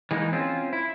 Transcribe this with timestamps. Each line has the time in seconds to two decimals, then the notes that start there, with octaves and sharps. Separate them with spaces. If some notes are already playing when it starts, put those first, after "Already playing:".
0.11 E3 G#3 A#3 D#4
0.32 C4 C#4 F4
0.73 E4